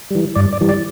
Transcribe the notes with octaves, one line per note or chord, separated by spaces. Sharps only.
E3 G3
G2 D5
D5
E3 G3
D5